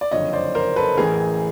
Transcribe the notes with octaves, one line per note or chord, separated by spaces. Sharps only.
D5
F#1 F2 D3 C#5 D#5
C5 D5
A#4 C5
A4 B4
A1 A2 E3 G#4 A#4